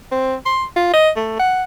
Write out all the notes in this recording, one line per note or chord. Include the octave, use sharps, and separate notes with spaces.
C4
C6
F4
D#5
A3
F#5